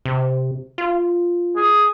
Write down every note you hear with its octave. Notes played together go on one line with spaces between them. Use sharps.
C3
F4
G#4